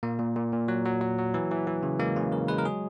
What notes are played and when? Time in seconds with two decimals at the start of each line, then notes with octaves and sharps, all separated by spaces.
0.03 A#2 A#3
0.19 A#2
0.36 A#2
0.53 A#2
0.68 F#3
0.86 F#3
1.01 F#3
1.18 F#3
1.34 E3
1.51 E3
1.67 E3
1.83 C#3
1.99 G#3 A#3
2.16 C#3 C#4
2.32 C#3 A#4
2.48 G#3 B4
2.58 A#4
2.65 F#3 G#4